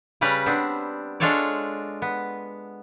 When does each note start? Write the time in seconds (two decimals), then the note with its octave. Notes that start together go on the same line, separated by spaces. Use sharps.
0.21 C#3 G3 B4 D5 A#5
0.46 B3 C4 D4
1.20 G#3 D4 F4 A4 C#5 D5
2.02 B3